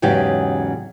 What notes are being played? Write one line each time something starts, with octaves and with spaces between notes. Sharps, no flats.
E2 G#2 C#3 F#3 G4